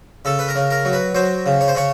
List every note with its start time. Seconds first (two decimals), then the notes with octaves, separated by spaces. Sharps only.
0.25 C#3 A4
0.39 B4
0.48 A#4
0.55 C#3
0.71 A#4
0.85 F#3
0.93 B4
1.15 F#3 C5
1.46 C#3
1.61 C#5
1.68 C5
1.75 C#3 C#5